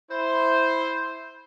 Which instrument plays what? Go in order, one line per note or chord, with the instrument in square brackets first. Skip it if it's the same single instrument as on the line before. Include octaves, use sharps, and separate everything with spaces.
[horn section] E4 C5